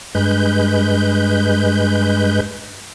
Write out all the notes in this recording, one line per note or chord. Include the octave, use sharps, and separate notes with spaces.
G2 G#3 B4 G6